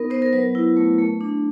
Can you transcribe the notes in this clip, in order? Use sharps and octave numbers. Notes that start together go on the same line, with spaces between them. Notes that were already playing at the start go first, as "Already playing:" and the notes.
Already playing: B3 D#4 A#4
B3 C5
A#4
F#3 B4
E4
A3
A3
D4